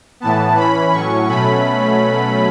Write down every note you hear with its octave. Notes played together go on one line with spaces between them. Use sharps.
A2 E3 B3 A5
E3 C#4 B5
A2 F#3 C#4 C#6
B2 F#3 A3 C#4 B5